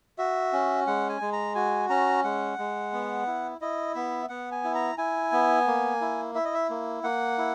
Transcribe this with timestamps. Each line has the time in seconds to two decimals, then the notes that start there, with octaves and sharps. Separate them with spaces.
0.18 F#4 E5
0.53 C#4
0.87 G#3 F#5
1.09 G#5
1.21 G#3
1.33 A#5
1.55 F#4 G#5
1.89 C#4 A#5
2.24 G#3 F#5
2.58 G#3
2.93 B3
3.27 E4
3.61 E4 D#5
3.95 B3 E5
4.29 B3 F#5
4.52 G#5
4.64 E4
4.75 A#5
4.98 E4 G#5
5.32 B3
5.67 A#3
6.01 E4
6.35 E4 E5
6.45 D#5
6.54 E5
6.70 A#3
7.04 A#3 F#5
7.38 E4